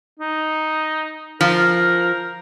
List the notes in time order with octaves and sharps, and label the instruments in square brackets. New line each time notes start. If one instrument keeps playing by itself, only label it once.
[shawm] D#4
[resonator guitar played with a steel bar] F3 [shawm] A#4